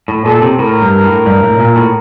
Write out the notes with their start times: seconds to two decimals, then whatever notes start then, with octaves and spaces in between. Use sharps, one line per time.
0.08 A2
0.25 A#2 A4
0.42 C3
0.58 A2 A#4
0.82 G2
1.04 A2
1.26 G2
1.43 A2
1.59 A#2
1.76 A2